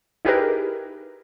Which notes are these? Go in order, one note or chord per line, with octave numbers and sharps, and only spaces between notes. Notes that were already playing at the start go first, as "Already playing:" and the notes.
D#4 E4 G4 G#4 A#4 B4